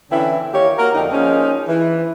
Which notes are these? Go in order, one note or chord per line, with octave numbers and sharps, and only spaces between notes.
D3 E3 C4 C#4 E4
D#3 A#3 E4 G4 C#5
A#3 F#4 A#4
F2 D3 C4 D#4
F3 G#3 A#3 C#4 D#4
E3